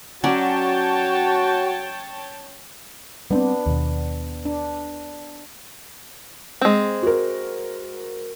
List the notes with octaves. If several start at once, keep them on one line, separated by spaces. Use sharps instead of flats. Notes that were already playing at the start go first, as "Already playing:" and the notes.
F#3 C#4 F#4 C#5 D5 G5 A5
G3 A3 B3 C4 D4
D#2 B2
D4
G#3 C4
F#4 A#4